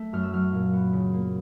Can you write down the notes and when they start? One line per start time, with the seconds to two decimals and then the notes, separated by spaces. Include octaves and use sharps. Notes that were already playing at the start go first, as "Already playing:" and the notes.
Already playing: A3
0.13 F#2 F6
0.23 E6
0.33 F#3 F6
0.53 A#2
0.73 B3
0.93 C#3
1.13 A#3